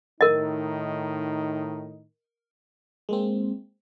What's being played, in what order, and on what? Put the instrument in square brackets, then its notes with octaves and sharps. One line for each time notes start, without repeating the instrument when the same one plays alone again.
[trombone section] A2 D#3 D#4 [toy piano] A#4 D#5
[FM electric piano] G#3 A#3 C4